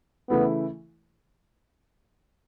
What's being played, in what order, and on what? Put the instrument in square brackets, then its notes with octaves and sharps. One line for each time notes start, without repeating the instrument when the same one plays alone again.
[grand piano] C#3 E3 A3 E4 [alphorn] B3